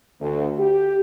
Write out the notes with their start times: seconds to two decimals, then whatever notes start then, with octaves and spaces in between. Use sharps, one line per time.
0.19 D2
0.58 G4